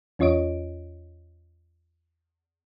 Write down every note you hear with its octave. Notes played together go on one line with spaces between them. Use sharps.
E2 C#4 F4 C#5 D#5 D7